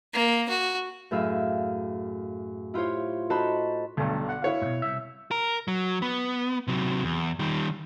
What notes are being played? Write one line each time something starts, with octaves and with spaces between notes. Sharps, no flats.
A#3
F#4
F#2 A2 G#4 E5 F5
E4 F4 G4 C5 C#5
D#4 F#4 A4 C5 A5 B5
B1 G2 D3 A3
D3 F#5
E4 C#5 F5
G#2 B2
C2 E5
A#4
F#3
B3
C3 F#3
E2
D#3 G3